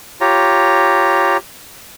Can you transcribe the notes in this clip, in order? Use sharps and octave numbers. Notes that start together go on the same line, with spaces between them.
F4 G4 C#5 A#5